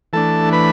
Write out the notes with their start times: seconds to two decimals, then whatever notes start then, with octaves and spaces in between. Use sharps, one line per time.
0.13 E3 A3 D4 A4 A5
0.52 B4 B5